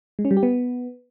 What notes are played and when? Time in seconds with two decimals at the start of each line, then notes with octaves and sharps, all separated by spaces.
0.19 G#3
0.25 C#4
0.31 G3
0.37 G4
0.43 B3